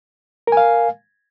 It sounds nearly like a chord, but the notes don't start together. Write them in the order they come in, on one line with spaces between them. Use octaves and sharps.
A#4 G#5 F5